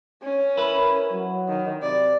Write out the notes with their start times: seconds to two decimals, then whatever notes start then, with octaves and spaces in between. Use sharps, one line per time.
0.23 C#4
0.57 E4 A#4 B4
1.12 F#3
1.49 D#3
1.83 C3 D5